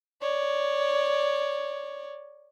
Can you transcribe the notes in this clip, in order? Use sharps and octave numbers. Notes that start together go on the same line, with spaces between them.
C#5 D5